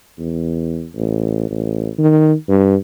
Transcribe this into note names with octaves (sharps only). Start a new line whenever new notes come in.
E2
A1
A1
D#3
G2